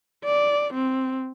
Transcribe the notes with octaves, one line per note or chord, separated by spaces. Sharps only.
D5
C4